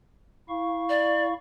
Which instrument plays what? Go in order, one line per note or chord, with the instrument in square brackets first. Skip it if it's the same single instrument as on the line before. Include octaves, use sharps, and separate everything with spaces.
[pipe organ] E4 F5 C#6
[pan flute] D5